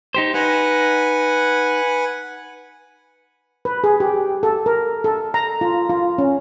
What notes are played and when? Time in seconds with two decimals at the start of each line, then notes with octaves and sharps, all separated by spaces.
0.15 D#4 G4 C5
0.34 D#4 B4 F#5 G#5
3.65 B4
3.84 G#4
4.00 G4
4.43 A4
4.66 A#4
5.04 A4
5.34 A#5
5.61 F4
5.89 F4
6.18 C#4